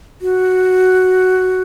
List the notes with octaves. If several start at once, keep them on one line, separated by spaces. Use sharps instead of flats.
F#4